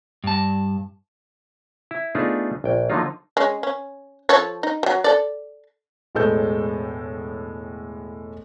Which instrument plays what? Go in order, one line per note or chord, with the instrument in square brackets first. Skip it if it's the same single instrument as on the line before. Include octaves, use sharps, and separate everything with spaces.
[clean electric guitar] G2 A5
[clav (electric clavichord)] E4
A3 B3 D4 D#4 F4 G#4
A#1 G5
D3 F3 F#3 A#3 D#4 F4
[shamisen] G#3 C#4
C#4
F3 A4 C#5
D#4
F#3 G3
A4 D5
[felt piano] E1 A2 G#3 A4 G6